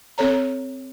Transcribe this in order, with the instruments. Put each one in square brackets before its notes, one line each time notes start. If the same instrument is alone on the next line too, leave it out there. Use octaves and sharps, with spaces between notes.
[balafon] C4 A4 C#5 A#5